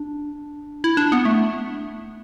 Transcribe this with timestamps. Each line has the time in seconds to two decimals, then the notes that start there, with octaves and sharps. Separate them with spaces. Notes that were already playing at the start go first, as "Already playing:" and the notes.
Already playing: D4
0.84 E4
0.97 D4
1.12 B3
1.25 A3